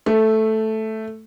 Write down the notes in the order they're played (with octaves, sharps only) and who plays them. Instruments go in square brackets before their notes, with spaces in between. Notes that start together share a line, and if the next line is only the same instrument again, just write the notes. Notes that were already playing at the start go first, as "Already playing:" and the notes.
[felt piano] A3